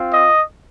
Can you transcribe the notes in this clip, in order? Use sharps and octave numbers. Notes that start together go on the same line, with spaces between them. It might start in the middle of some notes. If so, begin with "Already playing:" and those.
Already playing: C4 F4
D#5